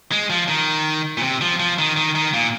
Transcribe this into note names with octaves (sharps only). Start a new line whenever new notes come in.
G#3
F3
D#3
A#2
C3
F3
F3
D#3
D#3
D#3
A#2